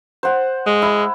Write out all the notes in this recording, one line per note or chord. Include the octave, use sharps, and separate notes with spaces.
C5 F#5
G#3
E4